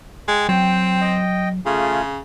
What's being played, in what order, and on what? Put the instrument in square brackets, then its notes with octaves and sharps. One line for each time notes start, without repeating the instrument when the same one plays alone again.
[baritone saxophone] G#3 [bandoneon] G5
[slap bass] F#3 [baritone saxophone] C4 [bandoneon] G5
[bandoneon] D#5 G5
[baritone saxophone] C#3 [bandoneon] A3 F4 G#4